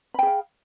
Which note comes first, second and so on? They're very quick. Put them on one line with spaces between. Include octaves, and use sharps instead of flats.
B5 G5 G#4 F5